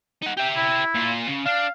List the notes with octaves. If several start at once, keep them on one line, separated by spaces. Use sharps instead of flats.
D#4 F#5
G4 E5 G5
E4
A#2 F4
C#3
D4 F5